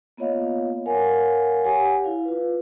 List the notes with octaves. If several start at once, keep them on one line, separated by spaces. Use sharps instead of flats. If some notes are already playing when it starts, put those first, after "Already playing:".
A#3 B3 F4 C#5 D#5 F5
A#4 C#5 F5 F#5 G#5
G4 C#5 F#5 G#5
E4 F5
F4 B4